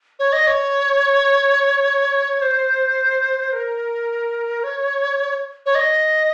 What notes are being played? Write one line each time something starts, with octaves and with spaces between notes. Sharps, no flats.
C#5
D#5
C#5
C5
A#4
C#5
C#5
D#5